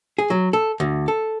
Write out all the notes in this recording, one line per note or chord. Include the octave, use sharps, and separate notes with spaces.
G#4
F#3
A4
D2
A4